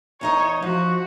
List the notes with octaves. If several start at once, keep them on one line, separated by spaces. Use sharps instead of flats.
E2 D#4 C#5 D#5
F3 F#4